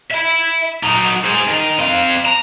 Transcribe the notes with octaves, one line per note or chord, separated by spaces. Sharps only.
E5 B5
F#3 D#4
G#4 C5
D#3
C4 F5
A#5